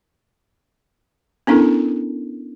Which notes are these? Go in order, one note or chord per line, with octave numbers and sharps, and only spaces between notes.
B3 C#4 D4 E4 A4 A#4